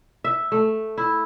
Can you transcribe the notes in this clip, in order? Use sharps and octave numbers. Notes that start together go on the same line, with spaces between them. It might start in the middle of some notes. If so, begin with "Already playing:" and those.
E5
A3
E4